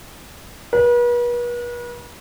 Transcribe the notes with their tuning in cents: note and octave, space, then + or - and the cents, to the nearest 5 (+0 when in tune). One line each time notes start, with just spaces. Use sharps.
B4 -40